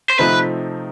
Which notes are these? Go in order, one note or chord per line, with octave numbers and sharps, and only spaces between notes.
C5
C3 F3 A3 C4 D#4 B4